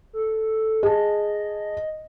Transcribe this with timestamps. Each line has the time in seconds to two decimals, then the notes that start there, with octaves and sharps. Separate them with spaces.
0.13 A4
0.83 G#4 D#5 A5